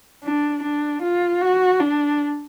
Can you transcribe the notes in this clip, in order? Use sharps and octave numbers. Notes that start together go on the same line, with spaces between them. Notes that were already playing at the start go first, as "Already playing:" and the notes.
D4
D4
F4
F#4
D4